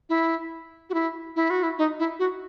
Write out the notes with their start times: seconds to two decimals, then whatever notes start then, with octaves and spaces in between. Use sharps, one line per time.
0.09 E4
0.90 F#4
0.94 E4
1.36 E4
1.50 F#4
1.63 E4
1.78 D#4
1.99 E4
2.19 F#4